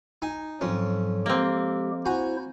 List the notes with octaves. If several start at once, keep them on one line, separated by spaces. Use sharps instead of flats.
D#4 G#5
F2 G#2 F#3 C#4
G#3 A#3 C4 G4
E4 F#4 C5 G#5 A#5